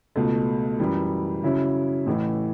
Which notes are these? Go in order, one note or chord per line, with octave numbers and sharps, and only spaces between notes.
C#2 B2 A3
F#2 E3 G3
C#3 F#3 C#4 E4
A1 A2 E3